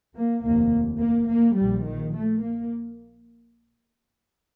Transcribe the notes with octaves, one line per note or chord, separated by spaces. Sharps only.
A#3
F1 D#2 A#3
A#3
A#3
A#1 A#2 G3
D#3
A3
A#3